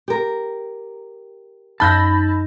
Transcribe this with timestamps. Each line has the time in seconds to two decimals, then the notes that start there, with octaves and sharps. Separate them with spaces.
0.08 G4 A#4
1.80 F#2 D#4 A5 B5 E6 G6 A#6